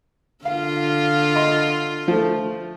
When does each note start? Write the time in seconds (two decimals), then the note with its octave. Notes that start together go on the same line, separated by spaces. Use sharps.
0.45 D3 F4 F5
1.36 D#5 C6
2.08 F3 A3